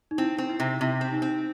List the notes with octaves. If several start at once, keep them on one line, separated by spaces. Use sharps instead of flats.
D#4
C4 E4
C4
E4
C3
C3 E4
C4
D#4
C4